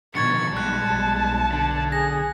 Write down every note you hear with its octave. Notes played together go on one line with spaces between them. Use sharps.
B2 D3 D#3 F3 C#6 G#6 A6 C#7
B1 G3 G#3 A5 F#6 A6
B1
D3
G#4 A#6